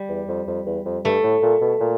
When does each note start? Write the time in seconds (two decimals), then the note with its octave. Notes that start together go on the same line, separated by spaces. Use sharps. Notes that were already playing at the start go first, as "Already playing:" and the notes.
Already playing: G3
0.09 E2
0.28 F2
0.47 F2
0.66 E2
0.86 F2
1.05 G2 A3
1.23 A2
1.43 A#2
1.61 B2
1.81 A#2